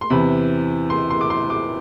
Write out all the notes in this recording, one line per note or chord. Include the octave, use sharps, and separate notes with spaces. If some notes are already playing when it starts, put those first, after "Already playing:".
C6
E2 C3 E3 B5
C6
C6
D6
C6
D6